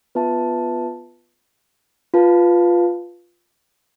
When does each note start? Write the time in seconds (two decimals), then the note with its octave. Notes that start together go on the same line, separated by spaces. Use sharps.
0.15 B3 F4 B4 E5 A5
2.14 F4 B4 F5 A5